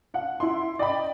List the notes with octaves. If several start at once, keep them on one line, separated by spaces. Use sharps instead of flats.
F5 F#5
E4 C6
D5 D#5 G5 B5